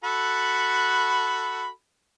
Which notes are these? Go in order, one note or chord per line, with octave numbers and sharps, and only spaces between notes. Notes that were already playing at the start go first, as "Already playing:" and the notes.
F#4 A4 B5